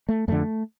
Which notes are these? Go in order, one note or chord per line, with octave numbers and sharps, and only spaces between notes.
A3
F2 D3 A3